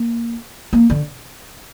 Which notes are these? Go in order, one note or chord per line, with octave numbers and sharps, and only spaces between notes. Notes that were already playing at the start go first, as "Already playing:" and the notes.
Already playing: A#3
A#3
D3